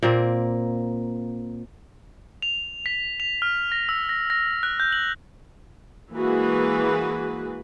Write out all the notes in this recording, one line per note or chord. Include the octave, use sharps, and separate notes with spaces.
A#2 A#3 C4
F7
B6
F7
F6
A#6
E6
A#6
A#6
F#6
G6
F#7
E3 G#3 A#3 F#4 G#4 B4